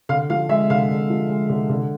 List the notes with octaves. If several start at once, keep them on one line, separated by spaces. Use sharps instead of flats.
D3 F5
F3 F5
G#3 E5
D3 F5
D3
F3
G#3
D3
D3